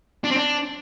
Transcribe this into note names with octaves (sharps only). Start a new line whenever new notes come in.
D4
C4
D4